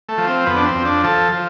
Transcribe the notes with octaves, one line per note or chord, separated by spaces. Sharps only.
A3
F3
C4
F2 B3
D4
C4
F2
D4
F3 A4
F3